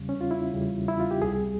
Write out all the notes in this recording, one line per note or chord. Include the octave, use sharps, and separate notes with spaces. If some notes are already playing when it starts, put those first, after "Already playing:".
Already playing: E2 C#3 G3
C#4
F4
E4
E2 C#3 G3
E4
F4
G4
C#2 C3 G3 G#4